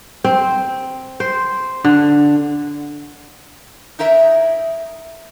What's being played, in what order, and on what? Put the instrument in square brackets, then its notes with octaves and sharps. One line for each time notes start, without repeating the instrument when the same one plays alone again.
[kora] C4
C5
D3
[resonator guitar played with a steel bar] D#4 E4 A#4 E5